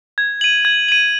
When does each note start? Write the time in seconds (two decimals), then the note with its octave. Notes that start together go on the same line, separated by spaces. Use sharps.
0.18 G#6
0.41 D#7 F#7
0.65 G#6
0.88 D#7 F#7